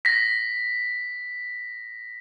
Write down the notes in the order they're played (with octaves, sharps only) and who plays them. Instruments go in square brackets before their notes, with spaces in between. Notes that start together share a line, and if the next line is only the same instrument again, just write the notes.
[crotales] A#6 B6